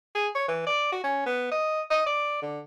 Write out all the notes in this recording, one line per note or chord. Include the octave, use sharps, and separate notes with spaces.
G#4
C#5
E3
D5
F#4
C#4
B3
D#5
D#5
D5
D3